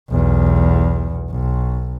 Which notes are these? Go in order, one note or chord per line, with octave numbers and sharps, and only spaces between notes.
B1 E2
B1